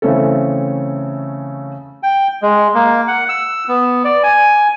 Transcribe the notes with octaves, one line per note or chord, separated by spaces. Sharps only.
C#3 E3 A3 C4 C#4 A4
G5
G#3
A#3
F#5
E6
B3
D5
G#5